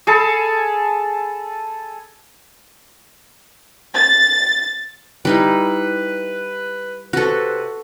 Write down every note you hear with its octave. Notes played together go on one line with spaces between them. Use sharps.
G#4 A4 A5 B5
A6
G3 D#4 E4 B4
C3 F#4 A4 B4